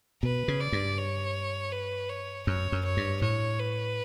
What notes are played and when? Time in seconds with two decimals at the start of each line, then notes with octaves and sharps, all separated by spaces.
0.23 B2 B4
0.48 C#3
0.61 D5
0.72 G2
0.98 C#5
1.72 B4
2.10 C#5
2.47 F#2 C#5
2.72 F#2
2.85 C#5
2.97 G2
3.22 A2 C#5
3.59 B4